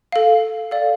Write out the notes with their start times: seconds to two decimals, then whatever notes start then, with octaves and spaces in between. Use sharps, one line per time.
0.12 A4 F5
0.71 A4 D5 F5